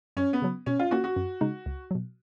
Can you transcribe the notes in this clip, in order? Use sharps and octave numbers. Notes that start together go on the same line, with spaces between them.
F#2 C#4
B3
C#3 F#3
B2 C#4
F4
A#3 C#4 F4 F#4
F#4
F#2
C#3 G#3 D#4
C#2
B2 F#3